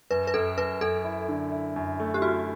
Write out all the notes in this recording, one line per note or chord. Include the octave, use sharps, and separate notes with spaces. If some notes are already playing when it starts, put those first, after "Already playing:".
F#2 B4
B4
F#2 A4
F#2 B4
F#2 A4
E4
D3
E4
F#2
A3
G4
E4 F#4